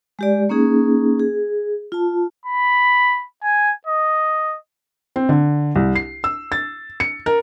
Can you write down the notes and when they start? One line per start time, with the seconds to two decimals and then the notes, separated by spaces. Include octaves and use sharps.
0.19 G#3 G4 D5
0.49 A#3 C#4 D#4 G#4
1.20 G#4
1.92 F4 A5
2.46 B5
3.43 G#5
3.87 D#5
5.16 C4
5.29 D3
5.76 C2
5.96 C7
6.24 E6
6.52 A6
7.00 C#7
7.26 A#4